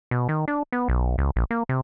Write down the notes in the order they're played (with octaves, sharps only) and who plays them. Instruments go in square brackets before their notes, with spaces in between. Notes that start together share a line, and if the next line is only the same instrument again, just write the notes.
[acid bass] B2
D#3
D4
B3
B1
C#2
A#1
A#3
C3